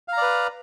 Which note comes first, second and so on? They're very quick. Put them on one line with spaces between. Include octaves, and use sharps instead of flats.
F5 A#5 D5 B4